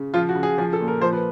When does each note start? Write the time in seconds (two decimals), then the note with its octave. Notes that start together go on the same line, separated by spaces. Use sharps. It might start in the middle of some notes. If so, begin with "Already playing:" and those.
Already playing: C#3
0.14 F3 F4
0.29 F#4
0.36 C#3
0.43 G#4
0.58 F3 G#4
0.73 A4
0.80 A#2
0.88 A#4
1.01 F3 C5
1.13 B4